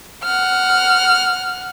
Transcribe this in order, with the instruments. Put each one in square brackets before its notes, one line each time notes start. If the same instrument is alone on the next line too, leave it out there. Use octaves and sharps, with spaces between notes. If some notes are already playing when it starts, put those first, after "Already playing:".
[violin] F#5 F6